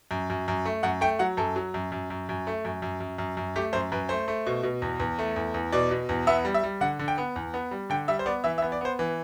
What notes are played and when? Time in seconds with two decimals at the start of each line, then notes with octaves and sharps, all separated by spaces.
0.11 F#2
0.30 F#2
0.48 F#2
0.65 A3
0.83 F#2 F#5
1.01 A3 G5
1.19 F#3 F#5
1.37 F#2 A4
1.56 F#3
1.74 F#2
1.92 F#2
2.10 F#2
2.29 F#2
2.47 A3
2.65 F#2
2.82 F#2
3.00 F#2
3.18 F#2
3.37 F#2
3.56 A3 G4
3.73 F#2 C5
3.92 F#2 B4
4.09 A3 C5
4.28 A3
4.46 B2
4.63 B2
4.82 E2
5.00 E2
5.19 A3
5.36 E2
5.54 E2
5.72 B2 D5
5.91 B2
6.09 E2
6.27 B3 E5
6.45 G3
6.54 E5
6.63 G3
6.81 D3 F#5
6.99 D3
7.08 G5
7.18 B3
7.36 E2
7.54 B3
7.71 G3
7.90 D3 G5
8.08 G3 E5
8.19 C5
8.26 B3 D5
8.44 E3 E5
8.58 E5
8.62 B3
8.72 D5
8.81 B3 C5
8.99 E3